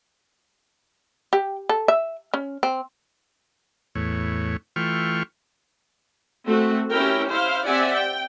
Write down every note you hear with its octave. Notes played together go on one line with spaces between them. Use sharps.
G4
A4
E5
C#4
C4
E2 A2 C#5
E3 A3 F4 G5 C#6 F6
A3 C4 F#4
C#4 E4 G4 A#4 G5
E4 C5 F5
C4 G4 D5 E5 F#5 G#5
G5